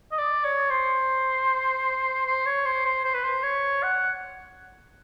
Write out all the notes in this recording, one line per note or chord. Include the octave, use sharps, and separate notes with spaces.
D#5
D5
C#5
C5
C5
C#5
C5
C5
C5
B4
C5
C#5
F#5